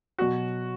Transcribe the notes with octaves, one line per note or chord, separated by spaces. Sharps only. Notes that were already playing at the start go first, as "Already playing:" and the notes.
B2 F#3 F#4